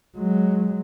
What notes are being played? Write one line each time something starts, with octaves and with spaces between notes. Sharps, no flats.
F#3 G#3